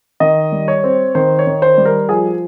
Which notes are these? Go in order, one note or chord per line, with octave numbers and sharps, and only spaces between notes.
D#3 D#5
G3
C#5
C4
D#3 C5
C#5
D#3
C5
G3
A#4
F3 G#4